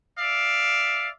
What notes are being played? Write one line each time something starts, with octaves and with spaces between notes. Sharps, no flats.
D5 E5 F5